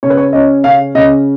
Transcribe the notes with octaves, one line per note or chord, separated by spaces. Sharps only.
C#3 C#5
B4
C#5
C#4 D#5
C#3 F5
C#3 D#5